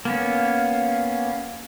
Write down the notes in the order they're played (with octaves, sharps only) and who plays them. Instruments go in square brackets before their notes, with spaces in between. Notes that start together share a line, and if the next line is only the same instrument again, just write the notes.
[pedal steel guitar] A#3 B3 C#4 [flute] F5